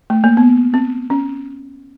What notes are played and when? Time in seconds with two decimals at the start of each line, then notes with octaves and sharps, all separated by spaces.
0.10 A3
0.24 A#3
0.37 B3
0.74 C4
1.10 C#4